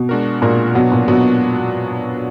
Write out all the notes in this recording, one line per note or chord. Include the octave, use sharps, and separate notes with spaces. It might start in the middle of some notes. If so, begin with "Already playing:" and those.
Already playing: B2
G#3 D4 F#4 A#4
A#2 G#3 D4 F#4 A#4
B2 F#3 B3 D4 F#4
A#2
B2 F#3 B3 D4 F#4